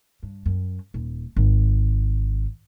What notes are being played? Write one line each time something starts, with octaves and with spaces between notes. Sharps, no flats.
G2
F#2
D#1
G#1